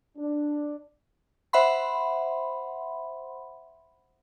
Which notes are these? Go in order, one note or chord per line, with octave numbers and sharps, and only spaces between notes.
D4
C5 E5 F#5 B5 C6